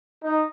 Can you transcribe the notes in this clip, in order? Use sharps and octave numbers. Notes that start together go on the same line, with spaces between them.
D#4